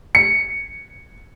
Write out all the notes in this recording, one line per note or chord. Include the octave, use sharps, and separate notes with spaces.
C#7